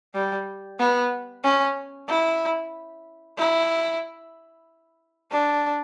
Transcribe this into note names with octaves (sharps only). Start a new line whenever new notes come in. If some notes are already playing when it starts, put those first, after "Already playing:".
G3
B3
C#4
E4
E4
D4